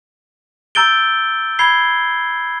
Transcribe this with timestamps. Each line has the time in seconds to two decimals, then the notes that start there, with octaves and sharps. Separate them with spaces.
0.75 A#5 E6 G6 A6 D7 G7
1.59 B5 G#6 C7 G7